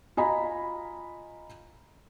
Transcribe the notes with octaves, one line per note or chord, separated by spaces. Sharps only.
F4 D#5 G#5 A#5 B5